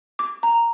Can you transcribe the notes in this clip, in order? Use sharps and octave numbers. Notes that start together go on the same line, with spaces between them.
D6
A#5